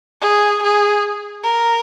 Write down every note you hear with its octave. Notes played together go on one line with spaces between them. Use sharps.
G#4
G#4
A#4